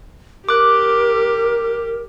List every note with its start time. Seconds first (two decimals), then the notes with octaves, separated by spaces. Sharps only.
0.49 G4 A#4 D6 F#6